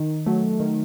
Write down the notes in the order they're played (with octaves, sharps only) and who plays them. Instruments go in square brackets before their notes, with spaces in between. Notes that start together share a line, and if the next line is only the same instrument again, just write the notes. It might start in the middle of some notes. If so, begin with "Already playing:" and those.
Already playing: [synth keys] D#3
F#3 A3
D#3